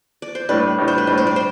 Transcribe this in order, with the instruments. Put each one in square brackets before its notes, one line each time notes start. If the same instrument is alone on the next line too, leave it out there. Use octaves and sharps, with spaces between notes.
[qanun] D5
C5
[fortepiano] A2 G3 D4 [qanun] B4
[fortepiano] A2 G3 D4
[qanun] C5
B4
[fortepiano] A2 G3 D4 [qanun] C5
[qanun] C5
D5
C5